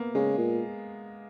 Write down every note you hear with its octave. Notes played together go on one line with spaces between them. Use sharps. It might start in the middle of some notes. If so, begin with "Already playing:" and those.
Already playing: A#3 B3
C#3 G#3
A#2